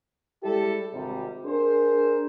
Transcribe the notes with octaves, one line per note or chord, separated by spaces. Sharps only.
G3 G#3 E4 G4 A4
G#1 G#2 C3 G3
D4 G#4 A#4 C5